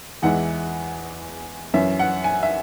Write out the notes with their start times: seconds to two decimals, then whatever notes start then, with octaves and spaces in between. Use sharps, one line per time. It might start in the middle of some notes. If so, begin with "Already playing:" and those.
0.22 E2 E3 G#3 E4 F#5
1.74 F#2 E3 C#4 E5
1.99 F#5
2.24 G#5
2.43 E5